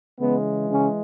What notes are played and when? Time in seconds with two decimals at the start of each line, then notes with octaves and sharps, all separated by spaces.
0.19 C#3 E3 G#3 B3
0.70 C#3 C#4